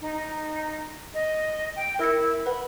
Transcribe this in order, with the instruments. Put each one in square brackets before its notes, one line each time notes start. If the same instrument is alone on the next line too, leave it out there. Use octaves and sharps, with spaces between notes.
[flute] D#4
D#5
G5
[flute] E4 [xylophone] A#4 A#6 C#7
[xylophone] B4 F#5 [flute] B5